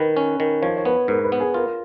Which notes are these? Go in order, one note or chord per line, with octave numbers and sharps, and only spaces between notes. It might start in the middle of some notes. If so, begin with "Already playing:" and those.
Already playing: D#3 B4
C#4
D#3
F3 C#5
C#5
B3 B4
G#2 A#4
B4
B3
G#4
F4 A#4